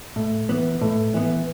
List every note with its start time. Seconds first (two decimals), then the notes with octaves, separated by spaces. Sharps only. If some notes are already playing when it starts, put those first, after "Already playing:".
0.16 A2
0.49 E3 B3
0.81 A2
1.14 E3 B3